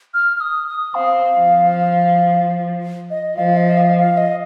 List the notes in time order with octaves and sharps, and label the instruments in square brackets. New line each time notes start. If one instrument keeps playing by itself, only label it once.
[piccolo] F6
F6
D#6
D#6
[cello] C4 [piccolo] F5
[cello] F3
[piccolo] D#5
[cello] F3 [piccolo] F5
[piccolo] D#5
F5
F5
D#5